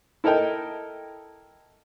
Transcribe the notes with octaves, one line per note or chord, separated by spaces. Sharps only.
E4 A4 A#4 D#5 G5